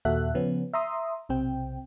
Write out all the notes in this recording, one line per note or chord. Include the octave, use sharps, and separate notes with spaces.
D#2 A#2 F#4 A4 E5 F#6
C#3 F3 B3 C#4
E5 A#5 C6 D#6
B1 C3 C4 G5